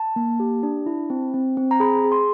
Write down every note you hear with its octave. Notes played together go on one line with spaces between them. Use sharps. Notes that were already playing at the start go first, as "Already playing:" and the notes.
Already playing: A5
A#3
G4
D4
E4
C4
C4
C4
A#5
G#4 B5
G#4
C6